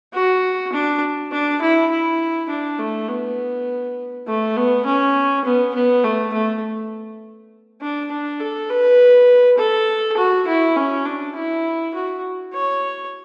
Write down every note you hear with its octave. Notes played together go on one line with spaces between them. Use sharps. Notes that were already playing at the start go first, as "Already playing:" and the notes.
F#4
D4
D4
E4
E4
D4
A3
B3
A3
B3
C#4
B3
B3
A3
A3
D4
D4
A4
B4
A4
F#4
E4
C#4
D4
E4
F#4
C#5